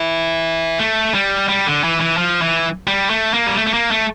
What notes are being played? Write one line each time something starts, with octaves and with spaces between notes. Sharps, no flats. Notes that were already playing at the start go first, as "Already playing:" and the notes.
Already playing: E3
A3
G3
G3
D3
E3
E3
F3
E3
G3
A3
A#3
G3
A3
A3
A#3
A3